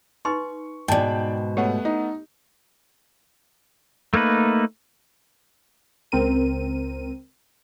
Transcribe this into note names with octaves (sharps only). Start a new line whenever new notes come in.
D#4 B4 C6 C#6
G#2 B2 D#4 D5 G5 A5
A3 B3 G4 C#5 F#5
D#4
A3 A#3 D#4 B4
C#2 C4 A#4 D#7